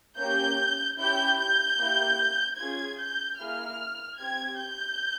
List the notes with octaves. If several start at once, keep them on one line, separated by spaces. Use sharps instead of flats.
A#3 C#4 G4 G6
C#4 E4 G4 G6
G6
A#3 E4 G4
C#4 F4 G#4 G#6
G6
A#3 E4 G#4 F6
C4 G4 G#6
G6